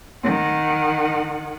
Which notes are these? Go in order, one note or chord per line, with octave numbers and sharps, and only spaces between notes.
D#3 F#5